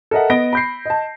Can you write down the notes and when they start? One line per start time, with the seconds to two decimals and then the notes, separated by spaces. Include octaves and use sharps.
0.11 A4 A#4 D#5 E5 F#5
0.30 B3 D#5 A#6 D7 G7
0.53 B5 G6 C7
0.86 D#5 A5